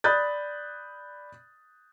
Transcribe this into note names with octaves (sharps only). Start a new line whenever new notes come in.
D5 B5 D#6 F#6 G6 A6